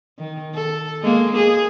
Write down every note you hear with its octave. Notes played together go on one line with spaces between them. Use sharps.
D#3
A4
G#3 A#3
G#4